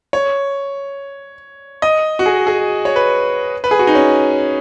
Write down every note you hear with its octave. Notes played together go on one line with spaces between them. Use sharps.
C#5
D#5
F#4
G#4
G#4
C#5
B4
B4
G#4
F#4
D#4
C#4